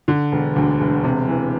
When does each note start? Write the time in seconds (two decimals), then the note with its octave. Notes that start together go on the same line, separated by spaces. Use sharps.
0.08 D3
0.32 E1
0.56 D2
0.80 E1
1.04 C3
1.28 E3